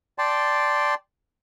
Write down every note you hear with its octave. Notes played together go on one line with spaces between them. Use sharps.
D5 G5 A5 C6